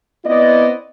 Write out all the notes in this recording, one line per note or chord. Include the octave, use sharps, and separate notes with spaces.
B3 C4 E4 D5 D#5